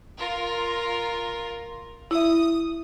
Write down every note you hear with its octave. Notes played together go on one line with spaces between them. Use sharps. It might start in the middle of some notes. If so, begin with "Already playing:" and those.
F4 A#4
E4 E5 D#6